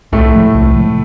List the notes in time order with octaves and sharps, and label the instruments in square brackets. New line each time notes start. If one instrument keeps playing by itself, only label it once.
[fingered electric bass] C2 [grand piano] A2 A3
[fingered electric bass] C3 F3 G#3
C2
C3 F3 G#3